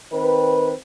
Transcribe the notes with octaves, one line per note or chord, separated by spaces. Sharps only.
D#3 C4 B4